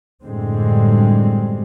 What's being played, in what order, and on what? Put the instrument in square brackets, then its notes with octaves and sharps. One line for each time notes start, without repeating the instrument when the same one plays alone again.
[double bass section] F#2 A2 D3 G3 G#3 C4